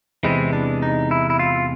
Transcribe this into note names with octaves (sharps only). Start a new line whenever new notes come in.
E2 C3 E3 G#3 C4 E4
D4
D#4
E4
E4
F4